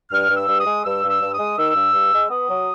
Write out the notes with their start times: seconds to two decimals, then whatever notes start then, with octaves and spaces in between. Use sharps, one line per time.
0.11 G2 F6
0.30 G2
0.36 E6
0.48 G2
0.60 D#6
0.66 G#3
0.85 G2 E6
1.03 G2
1.09 E6
1.21 G2
1.34 D#6
1.39 G#3
1.58 D#3 E6
1.76 G2
1.94 G2
2.13 G#3
2.30 B3 D#6
2.49 F#3